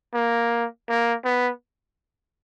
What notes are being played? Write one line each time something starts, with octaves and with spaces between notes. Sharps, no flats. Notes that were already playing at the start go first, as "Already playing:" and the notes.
A#3
A#3
B3